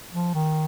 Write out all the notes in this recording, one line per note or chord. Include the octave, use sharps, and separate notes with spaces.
F3
D#3